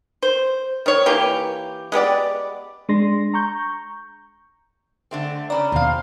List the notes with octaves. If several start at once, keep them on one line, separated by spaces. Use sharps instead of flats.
C5
D#3 C#5
E3 A#3 G4
G#3 B3 G4 D5
G#3 D4 C6 A#6
A#5 C#6 G6
D3 A3 C4
C#3 C#4 D4 D5 A#5 B5
D#2 B2 C4 F5